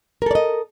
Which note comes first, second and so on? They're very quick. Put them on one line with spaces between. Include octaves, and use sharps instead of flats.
A#4 A4 D5 D#5